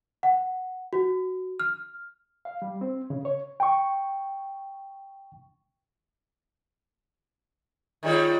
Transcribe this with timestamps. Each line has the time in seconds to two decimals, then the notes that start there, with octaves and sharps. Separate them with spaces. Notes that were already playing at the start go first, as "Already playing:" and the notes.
0.23 F#5
0.93 F#4
1.60 F6
2.45 F5
2.62 G3
2.81 C4
3.10 C#3
3.25 C#5
3.60 G5 C#6
8.03 D#3 G3 G#3 F4 C#5